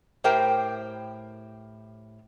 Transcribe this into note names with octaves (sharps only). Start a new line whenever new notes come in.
A2 G4 A#4 C5 G5